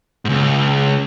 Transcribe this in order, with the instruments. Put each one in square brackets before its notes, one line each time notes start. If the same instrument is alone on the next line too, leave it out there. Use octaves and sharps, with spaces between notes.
[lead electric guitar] C#2 G#2